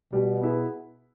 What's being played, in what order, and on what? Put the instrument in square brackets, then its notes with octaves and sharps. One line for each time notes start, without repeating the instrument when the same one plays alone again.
[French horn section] B2 [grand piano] G3
[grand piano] B3 E4 G#4 B4